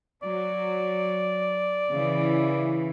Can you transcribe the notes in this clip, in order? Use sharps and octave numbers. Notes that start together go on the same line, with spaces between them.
F#3 D5
C#3 E3